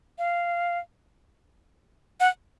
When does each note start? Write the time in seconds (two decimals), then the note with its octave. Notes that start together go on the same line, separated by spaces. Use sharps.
0.18 F5
2.20 F#5